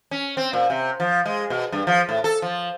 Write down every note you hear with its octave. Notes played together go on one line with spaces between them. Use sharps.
C#4
C4
A#2
C3
F3
G#3
B2
G2
F3
A2
A4
F3